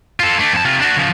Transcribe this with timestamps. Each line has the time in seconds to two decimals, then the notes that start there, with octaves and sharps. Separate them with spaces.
0.20 F4 A4
0.39 A3 D4
0.53 F2 A5
0.65 C3 F4
0.80 D4 F#4
0.97 C#3 F3